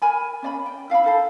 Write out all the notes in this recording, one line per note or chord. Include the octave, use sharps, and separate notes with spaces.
A#4 G#5 B5
C#4 D5 B5
G5
E4 F5 A#5 B5
D#4 A4 A5